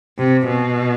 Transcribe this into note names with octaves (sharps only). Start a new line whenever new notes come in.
C3
B2